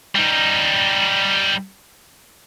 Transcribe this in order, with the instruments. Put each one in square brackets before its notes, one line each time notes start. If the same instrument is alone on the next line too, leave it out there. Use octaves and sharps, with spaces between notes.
[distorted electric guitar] G3 D#4